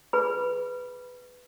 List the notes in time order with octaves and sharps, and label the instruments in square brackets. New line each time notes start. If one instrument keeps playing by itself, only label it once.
[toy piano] G#4 B4 B5